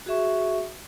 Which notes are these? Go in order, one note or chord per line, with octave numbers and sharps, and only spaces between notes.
F#4 G#4 E5 C#6